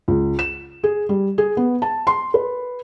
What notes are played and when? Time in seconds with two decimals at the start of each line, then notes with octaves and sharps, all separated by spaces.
0.08 C#2
0.39 E7
0.83 G#4
1.09 G3
1.38 G#4
1.57 B3
1.82 A5
2.07 C6
2.34 B4